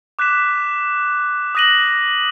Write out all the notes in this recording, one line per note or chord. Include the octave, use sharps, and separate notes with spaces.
D6 F#6 B6 E7
D#6 F#6 A#6 D#7 F#7